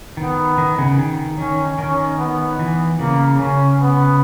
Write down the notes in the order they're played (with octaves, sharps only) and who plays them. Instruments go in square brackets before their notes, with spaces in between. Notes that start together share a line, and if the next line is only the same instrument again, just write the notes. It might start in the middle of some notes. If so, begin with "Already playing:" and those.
[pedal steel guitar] D#3 [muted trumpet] B3
[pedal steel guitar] D#3
C#3
D#3
[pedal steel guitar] D#3 [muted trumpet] C#4
[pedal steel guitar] D#3 [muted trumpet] C#4
[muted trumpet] B3
[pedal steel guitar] E3
[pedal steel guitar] C#3 [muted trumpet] A#3
[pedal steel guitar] C#3 [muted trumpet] C#4
[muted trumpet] B3